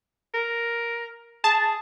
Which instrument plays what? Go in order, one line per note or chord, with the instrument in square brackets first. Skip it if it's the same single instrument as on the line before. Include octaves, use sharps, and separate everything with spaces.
[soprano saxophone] A#4
[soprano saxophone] G#4 [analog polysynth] A5